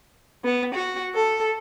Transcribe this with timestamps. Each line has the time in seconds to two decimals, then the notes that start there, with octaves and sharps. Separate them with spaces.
0.44 B3
0.73 F#4
1.14 A4